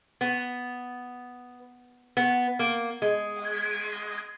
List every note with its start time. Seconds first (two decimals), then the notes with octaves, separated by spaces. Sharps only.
0.21 B3
2.17 B3
2.59 A#3
3.02 G#3